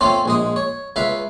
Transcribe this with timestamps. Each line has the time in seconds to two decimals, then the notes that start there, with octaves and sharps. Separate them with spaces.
0.01 A3 C4 C#4 F4 A4
0.25 A#1 G#3 D#5
0.56 C#5
0.96 C#2 B4 E5 F5